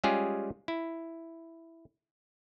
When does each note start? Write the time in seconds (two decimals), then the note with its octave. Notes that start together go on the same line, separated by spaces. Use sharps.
0.04 G3 G#3 C#4 F4 G4 G#4
0.68 E4